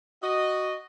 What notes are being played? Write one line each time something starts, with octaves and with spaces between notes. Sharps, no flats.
F#4 D#5